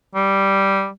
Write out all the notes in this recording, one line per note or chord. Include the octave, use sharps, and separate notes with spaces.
G3